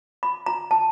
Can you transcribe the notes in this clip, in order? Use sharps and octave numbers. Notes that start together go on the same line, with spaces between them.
B5
A#5
A5